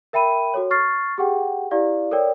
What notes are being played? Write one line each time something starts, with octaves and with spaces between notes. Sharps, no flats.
A#4 E5 G5 B5 D#7
F#4 A4 C#5
C#6 F6 A6 C7
G4 G#4 F#5 G5
E4 G4 D5 F5
A4 A#4 C#5 D5 G5